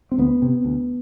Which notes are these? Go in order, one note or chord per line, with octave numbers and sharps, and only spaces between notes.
C4
D2 B3
C3
D2